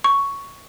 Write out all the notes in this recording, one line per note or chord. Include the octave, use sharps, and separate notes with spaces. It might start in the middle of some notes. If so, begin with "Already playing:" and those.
C#6